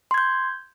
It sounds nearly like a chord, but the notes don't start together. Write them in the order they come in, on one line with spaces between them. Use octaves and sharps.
C6 G#6 G6